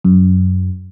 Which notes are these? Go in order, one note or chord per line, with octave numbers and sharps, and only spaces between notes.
F#2